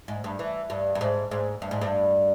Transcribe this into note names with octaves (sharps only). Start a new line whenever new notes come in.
G#2
G2
E3
G2
G2
G#2
G#2
G2
G#2
G2